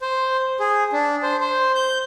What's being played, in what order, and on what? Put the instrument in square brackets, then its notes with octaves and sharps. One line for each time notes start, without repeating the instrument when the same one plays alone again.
[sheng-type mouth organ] C5
G#4
D4
C5
C5
G6